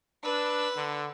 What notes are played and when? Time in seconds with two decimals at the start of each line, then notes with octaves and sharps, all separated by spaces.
0.24 D4 B4 E6
0.76 D3